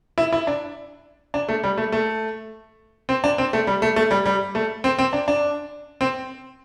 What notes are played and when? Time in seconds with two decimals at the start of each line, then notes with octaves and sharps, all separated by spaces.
0.18 E4
0.33 E4
0.47 D4
1.34 D4
1.49 A3
1.63 G3
1.78 A3
1.92 A3
3.09 C4
3.24 D4
3.38 C4
3.53 A3
3.67 G3
3.82 A3
3.96 A3
4.11 G3
4.25 G3
4.55 A3
4.84 C4
4.99 C4
5.13 D4
5.28 D4
6.01 C4